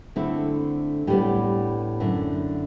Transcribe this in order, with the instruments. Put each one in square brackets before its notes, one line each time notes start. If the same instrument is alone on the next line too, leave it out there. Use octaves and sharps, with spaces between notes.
[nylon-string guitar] D3 A3 C4 E4
A2 G3 B3 G4
F#2 D3 A3 E4